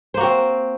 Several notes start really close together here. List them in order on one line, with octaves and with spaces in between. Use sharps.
C5 A#3 F#4 C4